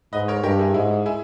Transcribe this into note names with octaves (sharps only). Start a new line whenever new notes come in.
G#2 B4 D#5
A#4 C#5
G2 G4 A#4
E4 G#4
G#2 E4 G#4
E4 G#4